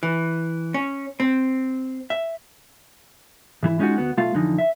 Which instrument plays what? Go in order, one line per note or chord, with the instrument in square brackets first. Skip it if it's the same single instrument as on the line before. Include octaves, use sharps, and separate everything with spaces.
[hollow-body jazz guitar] E3
C#4
C4
E5
[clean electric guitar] G#2 E3 E4
G#3 C#4 D#4 F4 F#4
D2 B3 F#4
B1 A3 F4 F5
F2 D3 E3 F3 D#4
E5